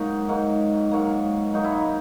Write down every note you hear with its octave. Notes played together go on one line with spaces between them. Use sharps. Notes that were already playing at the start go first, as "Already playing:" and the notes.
Already playing: G#2 F#3 A#3 D#4
G#2 F#3 A#3
G#2 F#3 A#3
G#2 F#3 A#3 D#4
E4
D#4